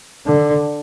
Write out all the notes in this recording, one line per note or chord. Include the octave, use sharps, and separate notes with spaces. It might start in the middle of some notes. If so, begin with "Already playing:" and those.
D3